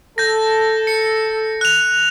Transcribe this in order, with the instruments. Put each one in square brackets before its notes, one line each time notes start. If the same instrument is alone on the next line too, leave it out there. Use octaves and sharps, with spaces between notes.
[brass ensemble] A4 [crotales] G6 A#6
[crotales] C#7
F#6 F7